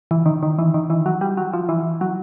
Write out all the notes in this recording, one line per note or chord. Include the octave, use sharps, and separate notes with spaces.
E3
D#3
D#3
E3
D#3
E3
F#3
G3
F#3
F3
E3
F#3